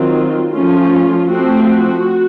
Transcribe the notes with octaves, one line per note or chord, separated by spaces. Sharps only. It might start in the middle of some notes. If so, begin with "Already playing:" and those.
Already playing: D#3 F#3 C4 F4
F3 A3 C#4 F4
F3 A3 C4 F#4
F#4